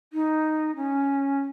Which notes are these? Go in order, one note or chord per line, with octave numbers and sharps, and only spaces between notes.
D#4
C#4